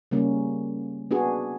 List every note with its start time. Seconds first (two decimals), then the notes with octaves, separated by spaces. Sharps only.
0.11 C#3 G3 A#3 C#4
1.11 B3 D4 F#4 G#4